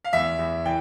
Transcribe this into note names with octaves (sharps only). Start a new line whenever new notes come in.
F5
E2 E5
E2
E3 G5